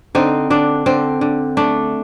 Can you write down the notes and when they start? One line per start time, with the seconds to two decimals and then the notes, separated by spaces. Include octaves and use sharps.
0.15 D3 C4 D#4
0.50 D3 D4
0.86 D3 C4
1.21 D3
1.57 A3 D4